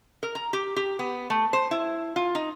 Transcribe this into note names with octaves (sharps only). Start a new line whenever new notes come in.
A#4
A#5
G4
G4
B3
A3
C5
E4
F4
D#4